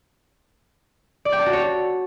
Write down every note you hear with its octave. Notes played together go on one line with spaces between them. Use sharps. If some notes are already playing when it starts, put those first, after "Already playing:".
D5
G5
A5
F#4
C#5